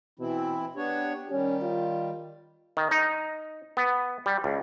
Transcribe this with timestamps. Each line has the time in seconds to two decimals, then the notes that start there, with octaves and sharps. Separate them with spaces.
0.19 B2 E3 C4 E4
0.76 B3 D4 G4 C#5
1.31 D#3 G3 C#4
1.61 F4
2.77 D#3
2.91 D#4
3.77 B3
4.26 G3
4.44 C#2